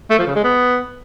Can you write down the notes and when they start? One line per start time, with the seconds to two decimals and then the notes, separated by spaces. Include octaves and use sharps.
0.10 A3
0.19 F3
0.27 C#3
0.36 G#3
0.44 B3